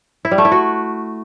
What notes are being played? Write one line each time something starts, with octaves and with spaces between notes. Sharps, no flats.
E4
G3
A3
E4
F#4